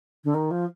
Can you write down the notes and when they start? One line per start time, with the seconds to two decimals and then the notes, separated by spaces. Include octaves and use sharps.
0.24 D3
0.34 D#3
0.51 F3